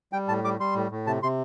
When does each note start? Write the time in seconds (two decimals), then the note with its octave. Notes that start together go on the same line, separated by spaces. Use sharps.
0.13 G3 G5
0.28 A2 A5
0.44 G3 D6
0.59 G3 C6
0.75 A2
0.91 A2
1.07 C3 A5
1.23 C3 C6